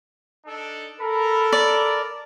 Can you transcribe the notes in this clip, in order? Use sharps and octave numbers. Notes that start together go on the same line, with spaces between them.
D4 D#4 A4
A4 A#4 B5
D5